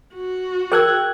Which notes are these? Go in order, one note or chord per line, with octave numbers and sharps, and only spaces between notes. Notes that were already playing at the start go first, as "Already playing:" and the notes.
F#4
G#4 A#4 G5 E6 F#6 G#6